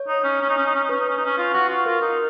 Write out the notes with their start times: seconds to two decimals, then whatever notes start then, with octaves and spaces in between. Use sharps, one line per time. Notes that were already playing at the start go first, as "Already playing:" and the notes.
Already playing: C#5
0.08 D#4
0.24 C#4
0.41 C#4
0.49 D#4
0.58 C#4
0.66 D#4
0.75 C#4
0.84 D#4
0.89 C#4 B4
1.00 D#4
1.09 C#4
1.18 D#4
1.26 C#4
1.38 F4
1.54 F#4
1.70 F4
1.86 F4 A#4
2.02 D#4